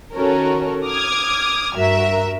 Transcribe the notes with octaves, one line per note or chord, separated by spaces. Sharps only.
D#3 C#4 F#4 A4 A#4 C#5
D6 D#6 F6 G#6
G2 F#4 A#4 E5